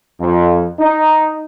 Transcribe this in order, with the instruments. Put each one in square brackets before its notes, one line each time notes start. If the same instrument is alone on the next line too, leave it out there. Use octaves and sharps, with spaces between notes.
[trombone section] F2
D#4